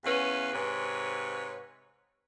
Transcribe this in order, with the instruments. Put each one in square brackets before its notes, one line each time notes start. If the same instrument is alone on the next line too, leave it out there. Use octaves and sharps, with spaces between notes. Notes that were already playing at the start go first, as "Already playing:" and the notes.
[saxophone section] E2 C#4 B4 F5
G#2 C3 B4 C#5